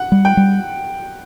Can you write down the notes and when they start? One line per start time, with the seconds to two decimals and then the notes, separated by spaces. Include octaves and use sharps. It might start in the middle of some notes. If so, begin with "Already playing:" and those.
Already playing: F#5
0.12 G3
0.25 G5
0.37 G3